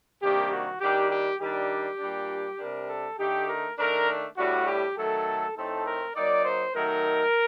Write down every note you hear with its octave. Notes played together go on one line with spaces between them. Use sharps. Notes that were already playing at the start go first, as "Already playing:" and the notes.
C3 D#3 G3 A#3 D4 G4
F#4
D#3 G3 D4 G4
G4
D#3 G3 D4 G4
A#2 G3 D4
C3 G3 D4 A#4
A4
D3 A3 D#4 G4
A#4
D#3 A3 D4 A#4
A2 G3 D4 F#4
G4
D#3 F#3 A3 A4
A2 A3 C4 D#4 A4
A#4
F#3 A#3 D#4 D5
C5
D#3 F#3 A3 D#4 A#4